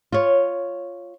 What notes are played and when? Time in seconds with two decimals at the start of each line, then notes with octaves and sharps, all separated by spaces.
0.12 F4 C#5